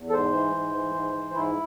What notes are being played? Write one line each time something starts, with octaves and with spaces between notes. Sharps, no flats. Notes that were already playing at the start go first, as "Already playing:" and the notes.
Already playing: E2
A4
G#2 C5
E3
G#2
E3
G#2
E3
G#2 E4